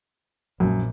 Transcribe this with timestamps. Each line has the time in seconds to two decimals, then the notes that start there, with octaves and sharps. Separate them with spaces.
0.60 A#1 F#2